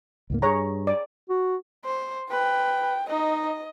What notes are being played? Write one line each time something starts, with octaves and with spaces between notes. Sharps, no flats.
C#2 G#2 A#3
G2 G#4 C#5 A#5
D5
F#4
C5
B4 G5
D#4 D#5